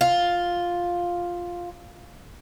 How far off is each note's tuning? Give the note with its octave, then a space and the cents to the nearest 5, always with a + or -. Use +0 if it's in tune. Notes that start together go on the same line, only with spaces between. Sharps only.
F4 +5